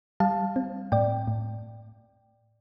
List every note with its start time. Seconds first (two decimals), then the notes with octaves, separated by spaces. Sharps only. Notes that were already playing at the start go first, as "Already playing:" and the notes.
0.20 G3 F5 A5
0.56 C4
0.92 A2 D5 G5
1.28 A2